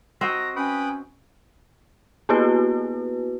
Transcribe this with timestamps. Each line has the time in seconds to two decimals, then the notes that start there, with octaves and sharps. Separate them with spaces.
0.21 C4 F#4 D#5 A#5
0.56 C#4 B4 G5 B5 D#6
2.29 A#3 B3 E4 F#4 B4